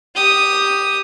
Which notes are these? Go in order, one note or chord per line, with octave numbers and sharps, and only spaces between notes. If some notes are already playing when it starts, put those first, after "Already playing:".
G4 D#6